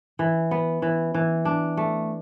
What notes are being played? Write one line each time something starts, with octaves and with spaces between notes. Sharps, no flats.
E3
B3
E3
E3
D4
A3